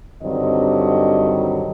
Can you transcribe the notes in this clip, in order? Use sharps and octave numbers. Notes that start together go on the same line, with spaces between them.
G2 D3 D#3 F#3 C4 D#5